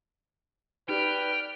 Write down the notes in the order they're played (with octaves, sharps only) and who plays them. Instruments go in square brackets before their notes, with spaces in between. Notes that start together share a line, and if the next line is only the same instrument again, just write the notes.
[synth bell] D#4 G4 [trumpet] B4 [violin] D5 F6 [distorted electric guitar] G5